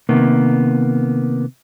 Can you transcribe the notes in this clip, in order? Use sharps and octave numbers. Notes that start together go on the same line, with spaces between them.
C3 D#3 A#3 B3